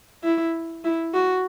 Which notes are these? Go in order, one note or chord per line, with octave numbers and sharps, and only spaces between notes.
E4
E4
F#4